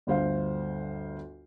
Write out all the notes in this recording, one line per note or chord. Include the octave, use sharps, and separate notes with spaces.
G1 D2 C5 F5